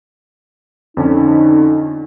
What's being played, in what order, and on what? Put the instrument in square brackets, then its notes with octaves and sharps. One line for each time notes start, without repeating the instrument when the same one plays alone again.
[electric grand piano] F2 D3 C#4 [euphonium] D#4